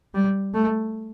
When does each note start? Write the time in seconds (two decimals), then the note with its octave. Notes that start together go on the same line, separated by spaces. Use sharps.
0.14 G3
0.54 A3